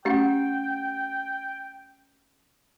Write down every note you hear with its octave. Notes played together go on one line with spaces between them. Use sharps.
A3 C#4 G4 F#5 G5